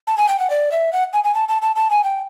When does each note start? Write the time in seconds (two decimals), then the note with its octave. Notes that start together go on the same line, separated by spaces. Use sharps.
0.07 A5
0.18 G#5
0.29 G5
0.40 F#5
0.50 D5
0.72 E5
0.93 F#5
1.13 G#5
1.24 G#5
1.34 A5
1.49 A5
1.62 A5
1.76 A5
1.91 G#5
2.04 G5